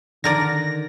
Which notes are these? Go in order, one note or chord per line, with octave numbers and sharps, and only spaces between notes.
D3 D#3 A#4 D5 A#6